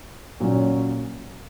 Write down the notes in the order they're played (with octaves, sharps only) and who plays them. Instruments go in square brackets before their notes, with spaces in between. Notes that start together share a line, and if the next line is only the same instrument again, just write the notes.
[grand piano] A#2 F#3 C#4